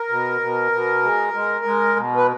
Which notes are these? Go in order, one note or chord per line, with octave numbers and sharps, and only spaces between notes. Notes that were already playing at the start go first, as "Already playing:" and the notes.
Already playing: A#4
B2
B2
B2
G#3
G#3
G#3
B2
B4